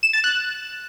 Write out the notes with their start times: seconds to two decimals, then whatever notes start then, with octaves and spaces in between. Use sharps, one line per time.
0.03 E7
0.13 A6
0.24 F#6